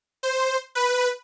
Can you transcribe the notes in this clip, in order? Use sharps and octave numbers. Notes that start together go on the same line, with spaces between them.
C5
B4